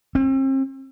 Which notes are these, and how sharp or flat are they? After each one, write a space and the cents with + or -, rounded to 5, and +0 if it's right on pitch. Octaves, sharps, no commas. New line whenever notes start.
C4 +40